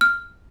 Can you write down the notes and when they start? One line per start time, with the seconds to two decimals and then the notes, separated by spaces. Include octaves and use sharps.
0.01 F6